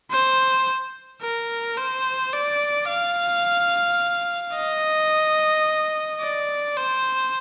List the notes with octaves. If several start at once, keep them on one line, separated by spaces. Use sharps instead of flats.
C5
A#4
C5
D5
F5
D#5
D5
C5